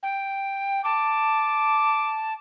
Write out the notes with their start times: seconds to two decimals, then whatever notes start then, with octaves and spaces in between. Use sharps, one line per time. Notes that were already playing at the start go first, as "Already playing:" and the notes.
0.03 G5
0.85 A5 D6